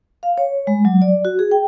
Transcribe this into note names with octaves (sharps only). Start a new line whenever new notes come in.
F5
C#5
G#3
F#3
D5
F#4
G#4
G5